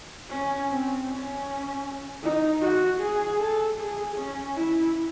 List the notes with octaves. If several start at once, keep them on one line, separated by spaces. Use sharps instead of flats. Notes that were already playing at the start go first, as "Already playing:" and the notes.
C#4
C4
C#4
D#4
F#4
G#4
A4
G#4
C#4
E4